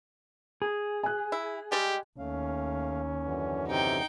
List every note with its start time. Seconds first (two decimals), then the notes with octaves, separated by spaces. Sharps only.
0.62 G#4
1.03 G#5 F#6
1.32 E4
1.72 G3 G#3 G4
2.19 D#2 A3 C#4 F5
3.23 F#2 D3 E3
3.68 C3 D#4 G5